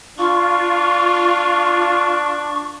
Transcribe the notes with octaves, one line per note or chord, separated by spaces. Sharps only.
D4 F4 C#6